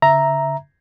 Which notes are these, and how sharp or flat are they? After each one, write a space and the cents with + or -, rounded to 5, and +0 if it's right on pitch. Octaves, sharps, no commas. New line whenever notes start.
D3 -45 E5 +0 A#5 +0